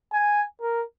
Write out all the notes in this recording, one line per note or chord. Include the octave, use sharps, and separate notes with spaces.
G#5
A#4